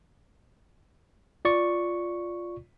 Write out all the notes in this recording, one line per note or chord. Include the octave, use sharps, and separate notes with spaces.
F4 D5 C#6